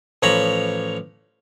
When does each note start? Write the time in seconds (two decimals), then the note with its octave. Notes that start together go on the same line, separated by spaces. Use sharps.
0.23 A1 F3 C#5 A#5 B5